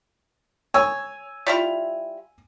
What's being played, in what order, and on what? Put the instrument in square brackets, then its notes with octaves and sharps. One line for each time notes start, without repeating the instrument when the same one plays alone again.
[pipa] C#5 [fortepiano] G#5 E6
[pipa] G3 E4 F4